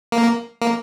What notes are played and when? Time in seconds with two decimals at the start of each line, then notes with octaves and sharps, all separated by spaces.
0.12 A#3
0.61 A#3